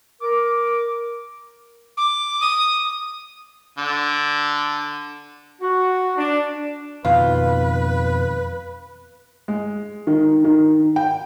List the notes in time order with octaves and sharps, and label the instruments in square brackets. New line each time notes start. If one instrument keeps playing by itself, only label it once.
[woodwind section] A#4 D6
[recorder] D6
D#6
[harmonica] D3
[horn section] F#4
D4
[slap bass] F2 B2 D#3 [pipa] F4 [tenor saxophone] B4
[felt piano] G#3
D#3
D#3
G5